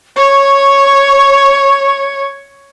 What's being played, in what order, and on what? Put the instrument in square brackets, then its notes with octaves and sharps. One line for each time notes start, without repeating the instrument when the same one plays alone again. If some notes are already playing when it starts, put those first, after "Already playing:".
[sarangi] C#5 [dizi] C#6